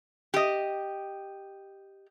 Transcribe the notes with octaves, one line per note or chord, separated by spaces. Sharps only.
G4 D#5